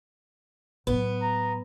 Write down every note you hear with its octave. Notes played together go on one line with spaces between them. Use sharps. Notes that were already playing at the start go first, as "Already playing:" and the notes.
A2 F#3 B3
A#5